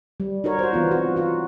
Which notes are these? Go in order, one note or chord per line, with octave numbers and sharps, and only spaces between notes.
G3
D#4 F#4 A#4 C#5
F#4 C5
E3 B3 F4
C4 F#4
F4 F#4